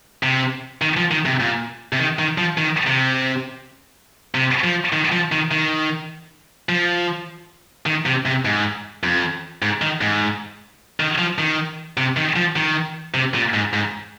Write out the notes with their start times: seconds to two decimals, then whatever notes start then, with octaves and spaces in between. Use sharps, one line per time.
0.23 C3
0.82 D#3
0.97 F3
1.11 D#3
1.26 C3
1.40 A#2
1.93 C3
1.99 D#3
2.19 D#3
2.38 F3
2.58 D#3
2.87 C3
4.35 C3
4.64 F3
4.93 D#3
5.12 F3
5.32 D#3
5.51 D#3
6.69 F3
7.86 D#3
8.06 C3
8.26 C3
8.45 G#2
9.03 F2
9.62 G#2
9.82 D#3
10.01 G#2
11.00 D#3
11.18 F3
11.38 D#3
11.97 C3
12.17 D#3
12.36 F3
12.56 D#3
13.14 C3
13.35 A#2
13.54 G#2
13.73 G#2